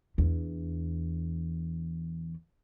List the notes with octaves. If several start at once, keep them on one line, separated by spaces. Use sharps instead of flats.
E2 D4